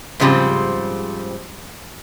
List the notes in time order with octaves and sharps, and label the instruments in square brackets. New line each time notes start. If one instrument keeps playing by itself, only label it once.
[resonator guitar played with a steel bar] G#2 C#3 F3 G3 C4